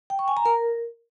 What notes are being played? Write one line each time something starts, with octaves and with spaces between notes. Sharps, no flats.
G5
C#6
G#5
A#5
A#4